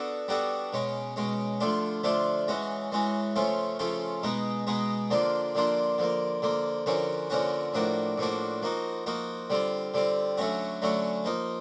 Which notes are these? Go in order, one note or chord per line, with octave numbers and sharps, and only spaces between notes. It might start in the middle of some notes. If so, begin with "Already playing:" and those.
Already playing: B3 D4 F#4 A4
G3 B3 D4 F#4 A4
B2 G#3 C#4
B2 G#3 C#4
D3 F3 A3 D4 F4
D3 F3 A3 D4 F4
E3 G#3 C#4 F#4
E3 G#3 C#4 F#4
C#3 F3 A3 C#4 F4
C#3 F3 A3 C#4 F4
B2 G#3 B3 D#4 G#4
B2 G#3 B3 D#4 G#4
D3 F3 A#3 D4 F4
D3 F3 A#3 D4 F4
D3 F3 A#3
D3 F3 A#3
D3 F3 A#3 C#4 F#4
D3 F3 A#3 C#4 F#4
A2 F3 A#3 D4 F#4
A2 F3 A#3 D4 F#4
F3 A#3 D#4 F#4
F3 A#3 D#4 F#4
D3 G3 C4 F4
D3 G3 C4 F4
D3 F#3 A3 C#4 F#4
D3 F#3 A3 C#4 F#4
F3 A#3 D#4